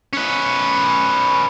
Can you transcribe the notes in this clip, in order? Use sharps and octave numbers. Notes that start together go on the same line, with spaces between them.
C#4 B4